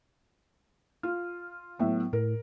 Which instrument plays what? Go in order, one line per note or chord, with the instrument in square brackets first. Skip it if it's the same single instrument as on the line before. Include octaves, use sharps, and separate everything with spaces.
[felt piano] F4 [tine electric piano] F6
[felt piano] A2 E5 [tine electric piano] F#3 B3
[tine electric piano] A2 [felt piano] A#4